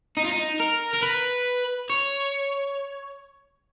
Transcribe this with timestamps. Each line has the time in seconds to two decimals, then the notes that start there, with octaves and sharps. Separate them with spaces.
0.17 D#4
0.25 F4
0.32 D#4
0.60 A#4
0.94 A#4
1.03 B4
1.90 C#5